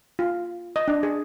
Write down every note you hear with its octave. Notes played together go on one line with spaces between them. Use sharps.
F4
D#5
D4
G#4